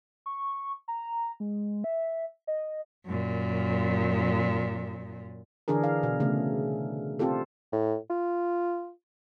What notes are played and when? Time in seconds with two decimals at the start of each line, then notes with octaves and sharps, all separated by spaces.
0.26 C#6
0.88 A#5
1.40 G#3
1.84 E5
2.47 D#5
3.06 F#2 A#2
5.68 D3 E3 D4 G#4 A#4
5.84 F5
6.03 B2
6.20 C#3 A3
7.19 C4 F4 G4 A4
7.73 A2
8.10 F4